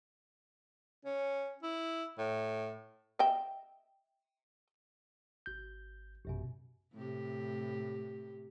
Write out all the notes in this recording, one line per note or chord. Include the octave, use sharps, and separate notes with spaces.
C#4
E4
A2
D#5 E5 G5
G#1 G6
A1 F#2 B2
A2 C3 G4